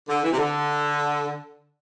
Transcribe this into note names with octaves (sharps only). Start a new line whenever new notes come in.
D3
E3
C3
D3